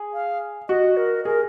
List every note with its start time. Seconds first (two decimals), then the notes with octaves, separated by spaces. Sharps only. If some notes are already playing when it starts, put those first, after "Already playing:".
Already playing: G#4
0.14 F5
0.69 F#4 D#5
0.97 A#4
1.25 G#4 A#4